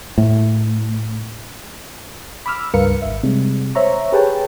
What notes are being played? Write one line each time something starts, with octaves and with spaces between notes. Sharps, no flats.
A2
B5 D6 E6 F6
C#2 G2 A#4 B4 F5 C#7
G#1 E5
C3 G3 G#3
C5 C#5 E5 A#5 C#6
G4 G#4 B4 C#5 G5 A5